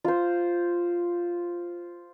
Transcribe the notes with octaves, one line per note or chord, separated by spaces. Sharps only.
F4 C5